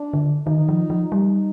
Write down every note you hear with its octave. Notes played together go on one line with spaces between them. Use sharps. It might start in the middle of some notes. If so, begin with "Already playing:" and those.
Already playing: D4
D3
D#3 D#4
F3
F3
G3 D#4